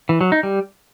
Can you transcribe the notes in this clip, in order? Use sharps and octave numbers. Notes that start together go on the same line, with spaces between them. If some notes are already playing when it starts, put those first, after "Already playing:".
E3
F#3
D#4
G3